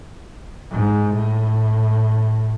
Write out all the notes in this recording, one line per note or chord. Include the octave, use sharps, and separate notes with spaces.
G#2
A2